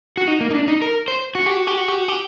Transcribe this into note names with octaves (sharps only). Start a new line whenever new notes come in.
F#4
D#4
A#3
D#4
D4
D#4
A#4
C5
F#4
G4
F#4
G4
F#4
G4
F#4
G4